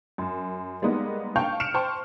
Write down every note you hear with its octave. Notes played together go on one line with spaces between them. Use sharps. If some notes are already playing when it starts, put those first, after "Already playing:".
F#2
G3 G#3 A#3 B3 D#4
F5 G5 A5 C#6 G6 F7
F6 C#7 D7 E7 F7
C5 G5 A5 C6 C#6